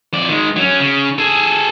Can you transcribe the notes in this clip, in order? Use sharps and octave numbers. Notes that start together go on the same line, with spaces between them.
F2 D5
D#3 G#3
F#3 C#4
C#3
G#4 A4